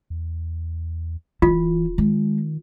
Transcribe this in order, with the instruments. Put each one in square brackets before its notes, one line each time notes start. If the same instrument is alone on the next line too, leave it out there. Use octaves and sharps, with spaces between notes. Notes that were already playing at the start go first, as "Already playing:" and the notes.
[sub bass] E2
[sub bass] D1 [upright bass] E3 [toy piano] F4
[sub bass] D#3 [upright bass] G#3